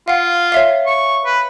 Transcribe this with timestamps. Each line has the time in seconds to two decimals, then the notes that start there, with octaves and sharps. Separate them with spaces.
0.08 F4 F5 F#5
0.52 C#5 E5 F5
0.87 C#6
1.25 B4